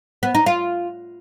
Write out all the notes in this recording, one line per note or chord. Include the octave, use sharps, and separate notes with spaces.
B3
D#4
F4